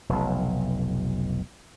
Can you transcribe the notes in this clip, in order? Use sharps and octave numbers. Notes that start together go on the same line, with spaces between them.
F1 B1